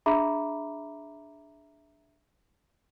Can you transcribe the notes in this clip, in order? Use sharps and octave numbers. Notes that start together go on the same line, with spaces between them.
D4 G#4 E5 A#5 B5 D6